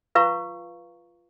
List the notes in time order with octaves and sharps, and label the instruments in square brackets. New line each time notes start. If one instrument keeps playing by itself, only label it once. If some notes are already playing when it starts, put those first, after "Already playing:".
[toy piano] F4 B4 F5 A#5 C#6